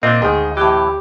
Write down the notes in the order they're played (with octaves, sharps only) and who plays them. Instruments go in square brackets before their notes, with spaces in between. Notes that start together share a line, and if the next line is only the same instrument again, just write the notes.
[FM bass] A#2 [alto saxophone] A#3 [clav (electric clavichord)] C4 D4 [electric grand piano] D#5
[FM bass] D2 [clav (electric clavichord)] G#2 D#3 [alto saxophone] G#4
[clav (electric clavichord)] A2 E3 [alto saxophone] G4